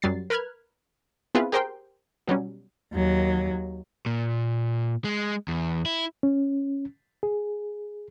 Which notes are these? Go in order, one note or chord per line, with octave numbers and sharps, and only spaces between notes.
F#2 F#3 G3 A6 C7
A#4 B4 B5 F6 F#6 G#6
B3 C4 E4 F4 G#4 B4
G4 G#4 A#4 C5 G5 C6
B2 F#3 G3 C#4
D#2 F#3
A#2
G#3
E2
E4
C#4
G#4